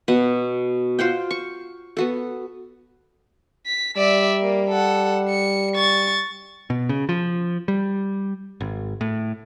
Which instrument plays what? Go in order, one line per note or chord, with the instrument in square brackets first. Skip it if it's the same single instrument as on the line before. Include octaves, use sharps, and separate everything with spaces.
[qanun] B2 B3 F#5
F4 C5 F#5 G5
C#6
B3 F#4 A4
[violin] B6
[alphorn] G3 [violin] D5 E5
[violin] A#3
A4 F#5
C#7
C#6 A6
[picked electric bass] B2
C#3
F3
G3
G#1
A2